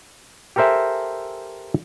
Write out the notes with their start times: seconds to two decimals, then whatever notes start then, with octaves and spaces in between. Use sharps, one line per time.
0.56 G4 A4 A#4 C5 E5 G#5